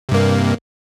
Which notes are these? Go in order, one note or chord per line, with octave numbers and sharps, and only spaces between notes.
G2 C3 A#3